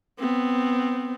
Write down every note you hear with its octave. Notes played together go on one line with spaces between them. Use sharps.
B3 C4